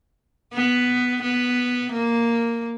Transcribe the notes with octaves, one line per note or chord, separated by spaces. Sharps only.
B3
B3
A#3